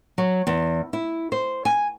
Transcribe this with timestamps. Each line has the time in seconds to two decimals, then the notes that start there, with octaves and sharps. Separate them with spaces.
0.18 F#3
0.47 E2
0.93 E4
1.32 C5
1.65 G#5